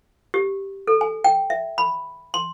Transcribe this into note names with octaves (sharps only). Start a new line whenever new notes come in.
G4
A4
G#5
G5
E5
B5
C6